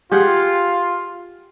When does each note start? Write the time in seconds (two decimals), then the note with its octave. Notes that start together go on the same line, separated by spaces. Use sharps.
0.12 F4 G4 G#4 F#5